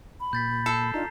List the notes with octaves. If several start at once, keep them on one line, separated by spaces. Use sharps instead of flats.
B5
A#2 G6 A6 B6
A4 C7
D4 D#4 F4 A#5